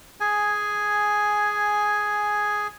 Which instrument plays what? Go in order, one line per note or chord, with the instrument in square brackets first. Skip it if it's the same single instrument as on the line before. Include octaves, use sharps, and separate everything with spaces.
[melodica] G#4 G#5